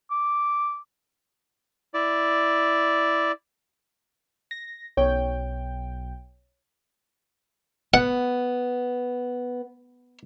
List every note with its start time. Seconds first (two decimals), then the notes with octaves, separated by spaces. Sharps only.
0.11 D6
1.94 E4 D5
4.51 A#6
4.97 B1 C#5 G5
7.94 B3 F#5